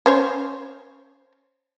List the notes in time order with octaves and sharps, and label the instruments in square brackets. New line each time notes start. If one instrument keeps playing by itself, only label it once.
[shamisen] C#4 C5 C#5